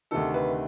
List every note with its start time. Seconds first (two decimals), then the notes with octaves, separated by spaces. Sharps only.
0.11 D2 C3 D#3 A4
0.34 B4